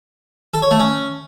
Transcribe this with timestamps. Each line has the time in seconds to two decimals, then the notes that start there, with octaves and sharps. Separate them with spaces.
0.54 A4
0.62 C#5
0.71 A3
0.80 C#4